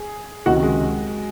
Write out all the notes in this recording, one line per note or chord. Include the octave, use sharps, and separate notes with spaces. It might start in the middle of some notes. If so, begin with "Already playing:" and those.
Already playing: G#4
C#2 C3 D#3 F#3 F#4
G#3